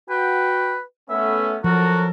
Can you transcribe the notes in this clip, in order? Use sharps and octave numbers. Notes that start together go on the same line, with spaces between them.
F#4 B4 G5
A3 B3 C#4 E5
F3 F#3 F#4 A4 A#4